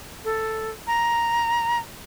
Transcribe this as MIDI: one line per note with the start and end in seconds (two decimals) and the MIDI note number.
0.25 0.70 69
0.87 1.79 82